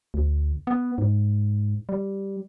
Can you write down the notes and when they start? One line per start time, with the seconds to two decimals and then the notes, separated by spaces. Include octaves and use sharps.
0.14 D2
0.67 B3
0.98 G#2
1.89 G3